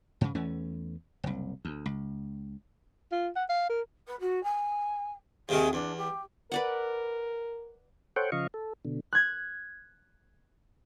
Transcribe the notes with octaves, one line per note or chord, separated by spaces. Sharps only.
G#2 C#3
E2 E3 A3 C#4
F#1 C2
D2
C#2
F4
F#5
F5
A#4
B4
F#4
G#5
D#2 C3 D#3 G#4
E2 D4
G4
A#4 B4 D5 F#5
A4 C5 C#5 F#5 G5
C#3 F3 D#5 F5 C#6
A4
B2 D3
F#6 G#6